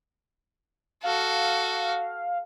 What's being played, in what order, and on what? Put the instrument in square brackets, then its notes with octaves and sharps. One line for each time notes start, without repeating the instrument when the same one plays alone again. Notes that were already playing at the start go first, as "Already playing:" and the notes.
[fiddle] F#4 A4 [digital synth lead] F5